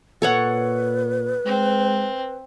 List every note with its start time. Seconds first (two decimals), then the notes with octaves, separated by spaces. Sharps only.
0.22 A#2 A4 B4 C#5 F#5
1.46 G#3 C4